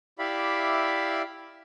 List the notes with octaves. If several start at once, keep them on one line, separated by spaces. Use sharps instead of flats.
E4 G4 D5 E5 F5 B5